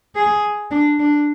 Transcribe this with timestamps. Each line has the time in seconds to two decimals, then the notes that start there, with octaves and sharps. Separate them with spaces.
0.16 G#4
0.71 D4
0.99 D4